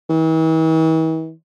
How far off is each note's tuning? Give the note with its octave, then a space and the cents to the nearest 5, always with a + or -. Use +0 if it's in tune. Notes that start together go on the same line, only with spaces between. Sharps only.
E3 -45